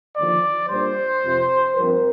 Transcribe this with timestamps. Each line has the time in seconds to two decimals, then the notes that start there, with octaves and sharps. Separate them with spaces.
0.17 D#2 D3 F3 D5
0.70 A#2 G3 D4 C5
1.23 F2 C3 F3 C4
1.75 G2 F3 C4 A#4